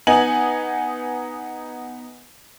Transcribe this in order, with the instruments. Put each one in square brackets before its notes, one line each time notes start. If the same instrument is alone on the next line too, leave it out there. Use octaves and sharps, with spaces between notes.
[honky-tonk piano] B3 D#4 G#5 F#7